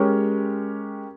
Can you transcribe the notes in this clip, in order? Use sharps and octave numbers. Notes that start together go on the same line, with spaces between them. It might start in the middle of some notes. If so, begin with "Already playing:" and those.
Already playing: G#3 C#4 G4 A#4 C#5